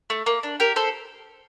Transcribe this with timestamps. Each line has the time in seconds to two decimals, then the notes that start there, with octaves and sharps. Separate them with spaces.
0.10 A3
0.26 A#3
0.43 D4
0.60 G4 A#4
0.76 A4 C5